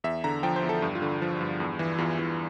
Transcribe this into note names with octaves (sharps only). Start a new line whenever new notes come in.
E2 E5
D3 A#5
F3 G5
C5
E2
A4
G2
F4
D3
F3
G2
E2
E3
E2 F4
E3